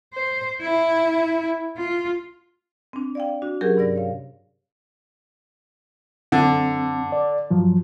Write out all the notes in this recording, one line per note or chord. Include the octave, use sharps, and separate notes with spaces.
C5
E4
F4
C4 D4
D5 F5 G5
D4 F#4
F#3 C#4 G4 G#4 A#4
G2 C3 D5 A#6
C#5 F5
F#2 D3 C4
D5
G2 F3 F#3